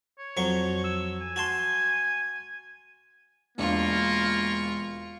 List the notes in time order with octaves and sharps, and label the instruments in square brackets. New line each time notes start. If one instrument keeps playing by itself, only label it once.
[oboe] C#5
[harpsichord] F2 F#3 C#6
[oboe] E6
G#5
[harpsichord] F#4 A5 C6
[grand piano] E1 D4 [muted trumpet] A#3 [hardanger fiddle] F4 C#6